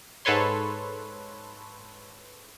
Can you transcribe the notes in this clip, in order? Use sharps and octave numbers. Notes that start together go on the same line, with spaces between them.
G#2 A4 B4 C#5 C6